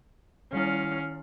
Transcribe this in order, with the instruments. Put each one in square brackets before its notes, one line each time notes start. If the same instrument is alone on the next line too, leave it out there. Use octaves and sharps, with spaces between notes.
[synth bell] D#3 G3 E4 [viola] C#4 F5